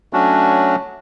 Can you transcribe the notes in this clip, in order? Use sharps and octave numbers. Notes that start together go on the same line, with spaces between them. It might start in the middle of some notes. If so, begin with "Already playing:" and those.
F#3 A3 C#4 D4 F#4